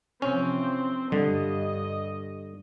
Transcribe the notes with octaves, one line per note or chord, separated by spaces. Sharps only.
C3 E3 F3 C4 C#4
G2 D3 G3 D#5